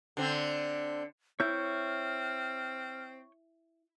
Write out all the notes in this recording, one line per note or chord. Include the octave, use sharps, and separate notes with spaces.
D3 C4
C4 E4 C#5 F6 G6